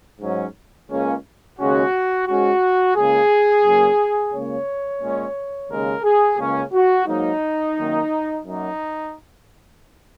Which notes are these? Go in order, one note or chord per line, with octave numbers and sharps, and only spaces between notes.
G#2 F#3 C#4
C#2 C#3 A#3 C#4
D#2 C#3 G#3 C#4 F#4
G#2 G#3 C#4 F#4
C#2 C#3 A#3 G#4
F#2 C#3 A#3 C#4
C#2 C#3 A#3 C#4 C#5
A#2 G#3 C#4
D#2 C#3 G#3 A#4
G#4
C#2 C#3 A#3 C#4
F#4
G#2 F#3 A#3 D#4
F#2 D#3 A#3
F#2 F#3 A#3 D#4